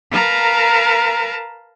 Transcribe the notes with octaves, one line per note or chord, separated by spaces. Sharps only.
A#4 B4 F5 A5 A#5